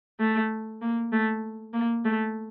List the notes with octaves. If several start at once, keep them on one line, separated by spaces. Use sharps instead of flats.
A3
A#3
A3
A#3
A3